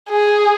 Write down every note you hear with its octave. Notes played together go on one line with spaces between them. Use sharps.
G#4